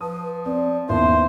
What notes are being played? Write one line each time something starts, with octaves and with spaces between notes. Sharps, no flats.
F3 B4 D#6
C4 D5
A1 D#2 B3 C5 E5